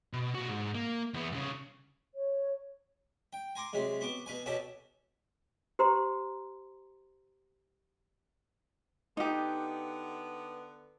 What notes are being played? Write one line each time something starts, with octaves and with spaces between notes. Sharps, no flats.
B2
A#2 F#4
G#2
A#3
E2 B3
C2 C#3
C#5
G5
G#5 A#5 C6 D6
C3 F#3 G#3
B3 F#4 D6
B2 B4 G#5
B2 C#4 F#4 G4 A4
G4 C5 A#5 C6
D3 B3 D#4 G4